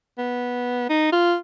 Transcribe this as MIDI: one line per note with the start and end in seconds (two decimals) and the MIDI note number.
0.18 0.85 59
0.90 1.09 63
1.12 1.35 65